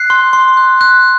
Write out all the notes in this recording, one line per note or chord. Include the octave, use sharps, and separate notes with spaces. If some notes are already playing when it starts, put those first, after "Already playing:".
Already playing: F#6 C7
C6
C6
F#6
F#6